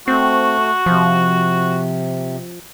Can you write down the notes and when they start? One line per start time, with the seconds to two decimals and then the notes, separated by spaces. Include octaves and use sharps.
0.08 A3 C4 F#4
0.86 C3 F3